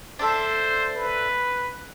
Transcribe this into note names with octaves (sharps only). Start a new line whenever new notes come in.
D4 A4 C5 E5
B4